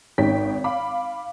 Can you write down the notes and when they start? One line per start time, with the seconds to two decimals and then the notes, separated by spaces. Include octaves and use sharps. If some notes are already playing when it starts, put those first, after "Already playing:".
0.18 G#1 C#4 D#4 C#5 G5 B6
0.64 F5 B5 D6